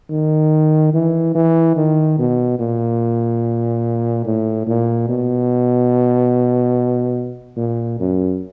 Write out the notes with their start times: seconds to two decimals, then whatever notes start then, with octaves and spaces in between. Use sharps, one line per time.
0.10 D#3
0.94 E3
1.35 E3
1.77 D#3
2.19 B2
2.60 A#2
4.25 A2
4.67 A#2
5.09 B2
7.57 A#2
8.00 F#2